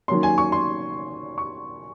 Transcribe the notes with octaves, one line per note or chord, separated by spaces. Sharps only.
D#3 F#3 A#3 C#4 C6
G#5
C#6
C6
C#6